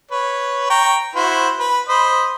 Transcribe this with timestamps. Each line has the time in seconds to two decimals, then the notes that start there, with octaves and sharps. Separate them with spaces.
0.11 B4 C#5
0.70 G5 A#5 C#6
1.15 E4 F#4 C5
1.59 B4
1.88 C5 D#5 B5